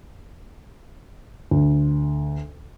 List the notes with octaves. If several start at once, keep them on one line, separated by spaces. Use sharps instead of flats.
D2